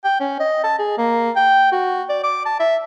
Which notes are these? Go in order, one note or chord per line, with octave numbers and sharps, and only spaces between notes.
G5
C#4
D#5
A5
G#4
A#3
G5
F#4
D5
D6
A5
E5